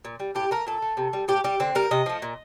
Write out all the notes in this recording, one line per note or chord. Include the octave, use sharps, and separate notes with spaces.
A#2
G3
A2 G4
A3 A#4
A#2 A4
A3
C3
G3
A2 G4
G3 G4
D3 C4
G3 A#4
C3 D#5
F3 A3
A#2